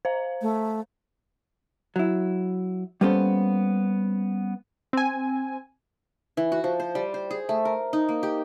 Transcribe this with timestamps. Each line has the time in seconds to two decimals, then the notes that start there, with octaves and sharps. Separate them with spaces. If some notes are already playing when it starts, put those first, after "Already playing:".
0.05 C5 F5 A#5
0.42 A3
1.96 F#3 E4
3.01 G3 A#3 B3 C#4 A4 C5
4.93 C4 G#5
6.37 E3
6.52 F#4
6.64 F3
6.80 C5
6.95 G3
7.14 C5
7.31 G#4
7.49 A3
7.65 A#4
7.93 D#4
8.09 A#3
8.23 G4